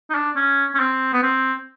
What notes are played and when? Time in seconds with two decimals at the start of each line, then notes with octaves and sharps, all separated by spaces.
0.10 D#4
0.15 D4
0.36 C#4
0.75 C#4
0.80 C4
1.13 B3
1.23 C4